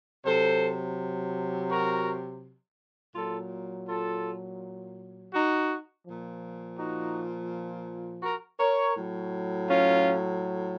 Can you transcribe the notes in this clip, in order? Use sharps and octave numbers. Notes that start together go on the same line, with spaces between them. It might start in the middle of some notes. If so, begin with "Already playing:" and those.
C3 F#3 A4 C5
F#4 A#4
A#2 F#3 F4 A4
F4 A4
D#4 F#4
A#2 F3
D#4 F#4
F#4 A#4
A#4 C#5
A2 F#3
C#4 F4